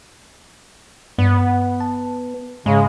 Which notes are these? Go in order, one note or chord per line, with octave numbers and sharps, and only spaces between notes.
G2 B3
A5
G#2 C#3 G#3